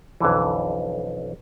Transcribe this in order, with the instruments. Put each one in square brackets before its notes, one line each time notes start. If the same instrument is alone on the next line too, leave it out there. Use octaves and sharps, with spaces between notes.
[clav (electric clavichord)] B1 F2 D3 E3